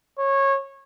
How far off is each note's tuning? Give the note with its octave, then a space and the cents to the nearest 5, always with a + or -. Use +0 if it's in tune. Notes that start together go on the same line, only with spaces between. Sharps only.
C#5 -20